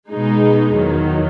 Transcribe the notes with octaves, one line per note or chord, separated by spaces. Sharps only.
B2 G#3 D#4
E2 D#3 F#3